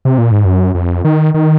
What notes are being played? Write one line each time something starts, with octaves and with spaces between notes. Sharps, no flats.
C3
A#2
G#2
F#2
F2
D#3
D#3